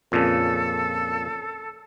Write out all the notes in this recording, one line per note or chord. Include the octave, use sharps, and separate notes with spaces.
F2 A#2 C#3 A4